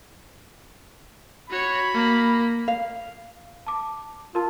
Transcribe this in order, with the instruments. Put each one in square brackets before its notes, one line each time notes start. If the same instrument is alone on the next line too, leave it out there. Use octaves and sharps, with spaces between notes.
[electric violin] F#4 C#5 [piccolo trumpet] B5
[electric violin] A#3
[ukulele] F5
[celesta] A5 D6
[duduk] F4 [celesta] A#4 A5